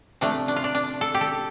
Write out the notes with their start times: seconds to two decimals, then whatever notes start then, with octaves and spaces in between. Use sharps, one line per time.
0.21 C3 F3 A3 D4
0.48 D4
0.56 F4
0.64 D4
0.75 D4
1.01 A4
1.14 G4
1.21 A4